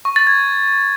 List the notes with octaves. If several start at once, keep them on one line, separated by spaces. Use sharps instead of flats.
C#6
A6
G#6